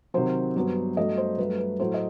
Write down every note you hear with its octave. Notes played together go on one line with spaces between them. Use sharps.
C3 D#3 F#3 C5
G2 F#3 B3
G2 F#3 A3 D#5
C5
G2 F#3 A3 B4
B4
A2 F#3 A3 C5
D#5